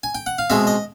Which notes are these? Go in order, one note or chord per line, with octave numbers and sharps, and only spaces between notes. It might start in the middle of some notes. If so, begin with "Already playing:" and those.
G#5
G5
F#5
F5
B2 G#3 C4 E5
D#5